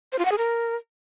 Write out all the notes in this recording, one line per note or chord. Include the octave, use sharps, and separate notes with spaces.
C5
F4
F#5
G#4
A#4